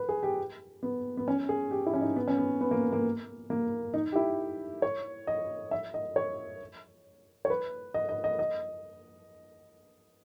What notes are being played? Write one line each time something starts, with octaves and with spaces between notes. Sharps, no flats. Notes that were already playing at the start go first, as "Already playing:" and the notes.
Already playing: B4
G#4
G4
B3
B3
C#4
G#4
G4
E4
C#4
D#4
B3
C#4
B3
B3
A#3
A#3
A#3
D#4
G4
E4
C#5
D#5
E5
D#5
C#5
C#5
B4
D#5
D#5
D#5
D#5